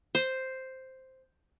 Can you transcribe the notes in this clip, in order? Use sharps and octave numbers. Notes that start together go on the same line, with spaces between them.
C5